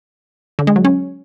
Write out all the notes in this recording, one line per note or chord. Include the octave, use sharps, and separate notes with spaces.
D3
G#3
F#3
C#4